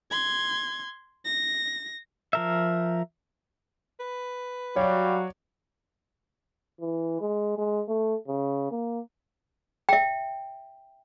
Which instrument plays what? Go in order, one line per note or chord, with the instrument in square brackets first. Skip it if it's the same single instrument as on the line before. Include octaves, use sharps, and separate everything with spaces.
[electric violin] C6 G#6
A#6
[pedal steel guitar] F3 A#4 E5
[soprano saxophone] B4
[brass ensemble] F#3 F#4 [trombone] G3 [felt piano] C#5 D5 [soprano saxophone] F5
[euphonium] E3
G#3
G#3
A3
C#3
A#3
[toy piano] E5 G5